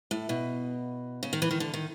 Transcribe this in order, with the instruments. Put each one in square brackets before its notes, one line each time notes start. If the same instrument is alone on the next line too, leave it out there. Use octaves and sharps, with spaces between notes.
[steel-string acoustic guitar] A2
B2
C#3
D#3
E3
D#3
D3
D#3